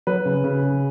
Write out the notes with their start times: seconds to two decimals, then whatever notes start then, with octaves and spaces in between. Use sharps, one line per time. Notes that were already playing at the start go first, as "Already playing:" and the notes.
0.07 F#3 B4
0.25 C#3
0.44 C#3
0.62 C#3